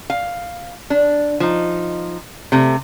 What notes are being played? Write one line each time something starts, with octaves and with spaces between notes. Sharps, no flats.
F5
D4
F3 D#4
C3 A3